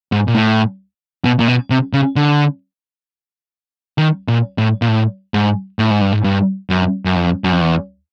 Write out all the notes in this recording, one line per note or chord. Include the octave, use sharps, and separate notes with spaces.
G#2
A#2
A2
B2
A#2
B2
C3
C#3
D3
D#3
A#2
A2
A#2
A2
G#2
A2
G#2
G2
G#2
G2
F#2
F#2
F2
F#2
F2
E2